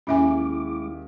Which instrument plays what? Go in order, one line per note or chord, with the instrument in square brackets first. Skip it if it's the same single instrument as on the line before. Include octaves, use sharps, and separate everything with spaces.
[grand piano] D#2 [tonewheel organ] G#3 E4 D6 [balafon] C#4 E5 G#5